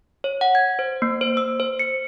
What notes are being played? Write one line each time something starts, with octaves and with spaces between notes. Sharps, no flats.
C#5
F#5
G#6
C5
A#3
C5
E6
C5
C#7